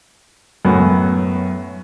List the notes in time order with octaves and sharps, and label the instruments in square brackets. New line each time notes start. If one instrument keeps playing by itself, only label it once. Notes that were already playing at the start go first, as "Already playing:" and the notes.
[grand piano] F#2 A2 B3